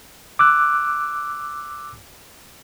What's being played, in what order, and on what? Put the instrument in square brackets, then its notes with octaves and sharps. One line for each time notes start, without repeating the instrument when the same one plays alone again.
[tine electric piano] D6 E6 F#6